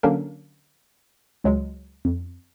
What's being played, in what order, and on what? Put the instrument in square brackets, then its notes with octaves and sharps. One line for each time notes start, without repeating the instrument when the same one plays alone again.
[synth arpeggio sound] D3 F#3 A#3 C#4 D4 A#4
C#2 F#3 G#3
F2